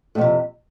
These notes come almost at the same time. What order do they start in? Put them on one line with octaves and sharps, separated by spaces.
A2 F2 C3